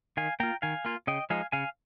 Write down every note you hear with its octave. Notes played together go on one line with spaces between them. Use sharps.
D#3 F5 G#5
A#3 F4 G5 A#5
D#3 F5 G#5
A#3 F4
C#3 D#5 G5
F3 G#3 D#4 F5 G#5
C#3 F5 G#5